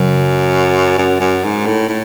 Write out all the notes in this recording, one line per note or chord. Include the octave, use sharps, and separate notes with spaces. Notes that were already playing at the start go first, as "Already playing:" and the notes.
Already playing: F#2 C#3 F#3
F#2
F#2
G#2
A2
A2